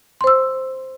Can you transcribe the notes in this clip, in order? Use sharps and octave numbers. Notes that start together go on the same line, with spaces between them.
C5 C6 E6